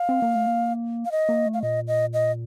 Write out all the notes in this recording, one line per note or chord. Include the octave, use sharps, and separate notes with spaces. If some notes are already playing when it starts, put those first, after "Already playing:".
Already playing: F5
C4
A#3
A3
A#3
F5
D#5
A#3
A3
F5
A#2 D#5
D#5
D#5